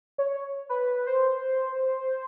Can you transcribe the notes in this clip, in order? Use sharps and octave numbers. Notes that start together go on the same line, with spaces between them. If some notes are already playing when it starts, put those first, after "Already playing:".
C#5
B4
C5